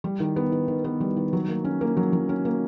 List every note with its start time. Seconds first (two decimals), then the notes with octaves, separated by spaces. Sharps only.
0.04 G3
0.20 D#3
0.36 B3
0.52 D#3
0.68 D#3
0.84 B3
1.00 G3
1.17 D#3
1.33 F#3
1.48 A#3
1.65 C#4
1.81 A#3
1.97 F#3
2.13 F#3
2.29 C#4
2.45 A#3